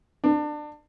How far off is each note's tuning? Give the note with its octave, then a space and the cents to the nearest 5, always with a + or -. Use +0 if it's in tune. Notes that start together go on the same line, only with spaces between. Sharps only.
D4 +25